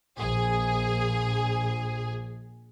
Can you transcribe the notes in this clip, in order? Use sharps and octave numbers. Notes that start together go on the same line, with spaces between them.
A#1 G#4